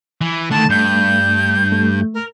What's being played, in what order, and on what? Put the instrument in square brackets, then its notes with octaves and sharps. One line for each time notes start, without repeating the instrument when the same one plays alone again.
[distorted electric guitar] E3
[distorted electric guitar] D3 D#3 [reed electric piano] A3 [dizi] A5
[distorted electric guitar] G2 [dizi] G6
[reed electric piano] A3
[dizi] A#4